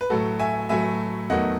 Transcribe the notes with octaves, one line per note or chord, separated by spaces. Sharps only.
B4
A2 F#3 A3 F#4 A4
E5 G#5
A2 F#3 A3 E5 G#5
E2 D#3 F#3 A3 D#5 F#5